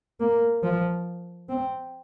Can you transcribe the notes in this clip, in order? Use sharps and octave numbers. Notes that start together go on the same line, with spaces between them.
A#3
F3
C4